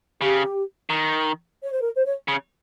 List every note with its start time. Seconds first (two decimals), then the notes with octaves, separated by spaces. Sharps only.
0.21 C#3 G4
0.90 D#3
1.62 C#5
1.71 C5
1.82 A#4
1.96 C5
2.05 C#5
2.28 C#3